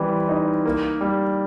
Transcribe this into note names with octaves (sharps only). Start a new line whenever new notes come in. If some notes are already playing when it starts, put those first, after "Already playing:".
Already playing: E3 G3 C4
D#4
A#3
G3